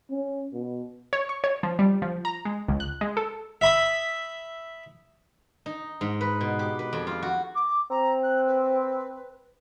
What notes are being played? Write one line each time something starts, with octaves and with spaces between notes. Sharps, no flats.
C#4
B2
C#5
C#6
C#5
F3
G3
F3
A#5
G#3
C#2
F#6
G#3
A4
E5 B5 D#6
D#4
G#2
B4
B2
G4
B4
F2
F4
F#4
D6
C4 A#5
F#6
B4